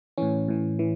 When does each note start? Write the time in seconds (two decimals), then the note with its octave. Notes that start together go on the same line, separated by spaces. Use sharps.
0.18 A2 E3 C#4
0.48 A2 E3
0.79 E3